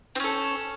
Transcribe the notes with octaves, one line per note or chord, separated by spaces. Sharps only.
C4 C#4 A4